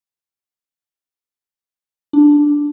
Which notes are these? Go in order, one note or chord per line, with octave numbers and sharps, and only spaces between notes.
D4